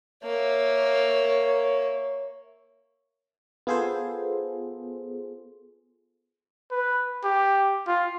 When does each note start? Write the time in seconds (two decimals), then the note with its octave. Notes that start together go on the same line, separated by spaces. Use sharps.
0.24 A#3 C#5 E5
3.67 B3 F4 G#4 A4 C5
6.71 B4
7.24 G4
7.87 F4